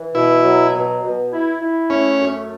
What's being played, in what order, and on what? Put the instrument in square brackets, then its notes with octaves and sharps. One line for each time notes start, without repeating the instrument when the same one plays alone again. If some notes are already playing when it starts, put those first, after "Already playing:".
Already playing: [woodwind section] E3
[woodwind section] B2 [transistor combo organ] E4
[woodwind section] F#3
B2
B2
E4
E4
[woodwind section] A3 [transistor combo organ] C#4
[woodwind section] F#2